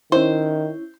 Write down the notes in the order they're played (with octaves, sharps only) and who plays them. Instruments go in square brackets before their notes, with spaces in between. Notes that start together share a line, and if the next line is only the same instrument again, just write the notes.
[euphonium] D#3 [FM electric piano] C#4 E4 [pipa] C5